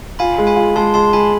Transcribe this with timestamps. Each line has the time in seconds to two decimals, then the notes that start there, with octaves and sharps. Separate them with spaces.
0.19 F4 G#5 B5
0.38 G#3
0.47 G#5 B5
0.56 F4
0.76 G#3 A5 C6
0.94 G#3 A5 C6
1.13 G#3 G#5 B5